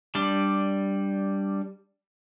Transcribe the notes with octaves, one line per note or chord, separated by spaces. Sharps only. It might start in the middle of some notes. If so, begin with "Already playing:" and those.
G3 D4 D6